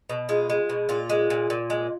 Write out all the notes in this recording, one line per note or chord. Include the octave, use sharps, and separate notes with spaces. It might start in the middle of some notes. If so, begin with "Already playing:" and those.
B2
G#3 F4
G#3
B2
A#2 F4
G#3
A#2
A#2
G#3